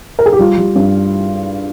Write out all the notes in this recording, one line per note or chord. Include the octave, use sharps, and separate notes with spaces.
A#4
G#4
G4
G3 F4
G3
G2